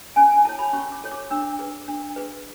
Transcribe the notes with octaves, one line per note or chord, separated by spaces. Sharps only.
C#4 G#5
G#5
E4 A4 C#5 A5
B5
C#4 C#6
D6
E4 A4 C#5
D6
D4 E6
G#4 B4
D4
G#4 B4